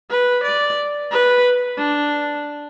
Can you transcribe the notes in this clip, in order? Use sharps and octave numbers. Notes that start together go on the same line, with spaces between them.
B4
D5
B4
D4